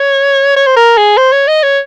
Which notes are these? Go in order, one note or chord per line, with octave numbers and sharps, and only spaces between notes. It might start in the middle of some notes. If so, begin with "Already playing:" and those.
Already playing: C#5
C#5
C5
A#4
G#4
C5
C#5
D#5
C#5